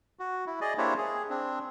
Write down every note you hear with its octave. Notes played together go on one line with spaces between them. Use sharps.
F#4
E4
G#4 D5 D#5
A#3 D4 E4 G4 C5 C#5
G#4
C4 D4